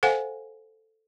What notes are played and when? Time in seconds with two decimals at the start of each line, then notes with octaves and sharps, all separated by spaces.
0.03 A4 C5 F5 F#5 G#5